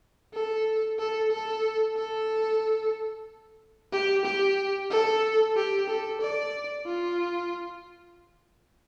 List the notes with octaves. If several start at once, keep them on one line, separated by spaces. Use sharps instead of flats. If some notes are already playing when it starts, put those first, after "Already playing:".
A4
A4
A4
A4
G4
G4
A4
G4
A4
D5
F4